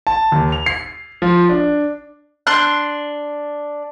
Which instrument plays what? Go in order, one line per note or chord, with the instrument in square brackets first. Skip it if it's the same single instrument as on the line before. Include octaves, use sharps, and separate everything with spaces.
[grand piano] A5
D#2
F7
C7
F3
D4
[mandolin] D4 C6 F#6